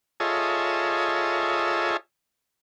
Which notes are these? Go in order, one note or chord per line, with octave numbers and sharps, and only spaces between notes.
F4 G#4 A4 C#5 D#5 E5